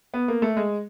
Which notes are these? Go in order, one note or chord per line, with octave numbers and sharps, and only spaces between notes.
B3
A#3
A3
G#3